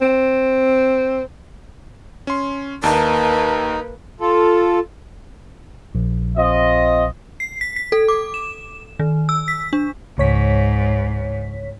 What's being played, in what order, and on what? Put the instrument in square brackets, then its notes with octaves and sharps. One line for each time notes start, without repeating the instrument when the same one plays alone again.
[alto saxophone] C4
[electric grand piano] C#4 C6
[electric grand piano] D#2 [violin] A#3 B4 [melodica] D#4 [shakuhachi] A5
[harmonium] F4 A4
[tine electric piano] A#1
[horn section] C4 F4 D#5
[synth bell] C7
B6
B6
A4
D6
E7
D#3
E6
B6
D4
[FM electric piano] C#2 C#5 B6 [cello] G#2